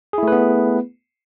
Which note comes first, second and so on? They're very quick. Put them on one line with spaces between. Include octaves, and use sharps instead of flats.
G#4 E4 A3 B4 B3